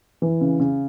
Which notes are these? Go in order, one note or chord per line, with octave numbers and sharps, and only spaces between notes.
E3
C#3
C#3